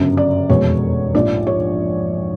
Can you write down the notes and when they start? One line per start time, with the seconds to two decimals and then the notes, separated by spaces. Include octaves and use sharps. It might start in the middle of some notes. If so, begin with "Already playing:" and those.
Already playing: G1 F#2 C#3
0.17 D5
0.49 F1 E2 B2 G#3 C#5
1.14 A#1 G#2 F3 D5
1.47 C#5